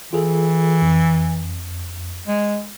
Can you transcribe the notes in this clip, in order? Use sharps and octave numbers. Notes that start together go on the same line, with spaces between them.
E3 F4 G#4 A4
F2
G#3